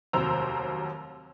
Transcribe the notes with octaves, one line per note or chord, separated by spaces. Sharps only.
F1 D#2 F#3 C5 A#5 E6